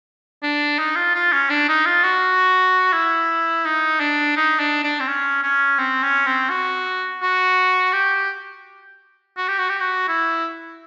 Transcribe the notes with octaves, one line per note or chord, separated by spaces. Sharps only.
D4
D#4
F4
F4
C#4
D4
D#4
F4
F#4
E4
D#4
D4
D#4
D4
D4
C4
C#4
C#4
C4
C#4
C4
F#4
F#4
G4
F#4
G4
F#4
G4
F#4
E4